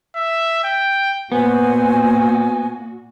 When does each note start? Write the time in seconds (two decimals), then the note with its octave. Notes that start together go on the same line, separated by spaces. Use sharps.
0.16 E5
0.64 G5
1.32 A#2 B3 F#4 C5 G#5